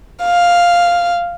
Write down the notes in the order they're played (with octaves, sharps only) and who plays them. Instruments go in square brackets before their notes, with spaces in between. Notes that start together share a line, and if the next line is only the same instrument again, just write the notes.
[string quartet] F5